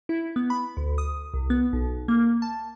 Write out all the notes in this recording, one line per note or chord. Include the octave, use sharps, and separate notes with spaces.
E4
B3
B5
D2
D#6
C2
B3
B1
A#3
A5